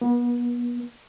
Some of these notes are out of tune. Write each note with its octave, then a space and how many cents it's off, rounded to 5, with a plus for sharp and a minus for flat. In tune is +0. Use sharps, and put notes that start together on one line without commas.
B3 -35